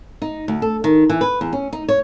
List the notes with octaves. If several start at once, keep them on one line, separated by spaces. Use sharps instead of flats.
D#4
D2
A4
D#3
E3
B4
E2
C#4
D#4
C#5